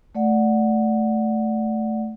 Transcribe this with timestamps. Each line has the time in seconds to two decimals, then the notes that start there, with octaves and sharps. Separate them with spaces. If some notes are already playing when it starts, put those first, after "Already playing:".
0.15 A3 D5 F#5